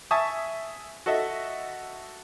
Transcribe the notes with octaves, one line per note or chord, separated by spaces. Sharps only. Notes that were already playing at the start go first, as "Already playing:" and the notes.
E5 G#5 A5 C#6 D#6
F#4 A4 D#5 E5